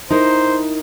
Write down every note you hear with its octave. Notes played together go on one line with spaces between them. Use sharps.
D#4 E4 A#4 C5